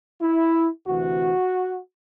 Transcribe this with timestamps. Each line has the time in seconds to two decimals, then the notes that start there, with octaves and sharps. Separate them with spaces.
0.21 E4
0.87 D2 C3 E3 F#4